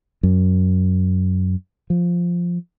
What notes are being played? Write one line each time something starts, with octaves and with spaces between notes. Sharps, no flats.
F#2
F3